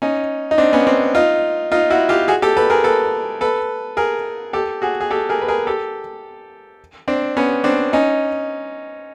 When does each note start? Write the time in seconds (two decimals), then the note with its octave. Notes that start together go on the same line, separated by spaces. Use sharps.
0.02 C#4 D#4
0.51 D#4
0.58 C4 D4
0.73 B3 C#4
0.87 C4 D4
1.15 D#4 F4
1.72 D#4 F4
1.90 E4 F#4
2.09 F4 G4
2.28 F#4 G#4
2.42 G4 A4
2.57 A4 B4
2.70 G#4 A#4
2.84 A4 B4
3.41 A4 B4
3.97 G#4 A#4
4.53 G4 A4
4.82 F#4 G#4
5.00 G#4
5.11 G4 A4
5.29 G#4 A#4
5.41 B4
5.48 G#4 A#4
5.67 G4 A4
7.08 C4 D4
7.37 B3 C#4
7.64 C4 D4
7.93 C#4 D#4